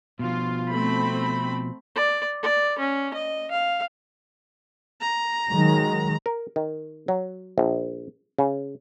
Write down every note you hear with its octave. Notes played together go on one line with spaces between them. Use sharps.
B2 F3 F4
A3 C4 B5
D5
D5
C#4
D#5
F5
A#5
D#3 F#3 G#3
A#4
D#3
F#3
A#1
C#3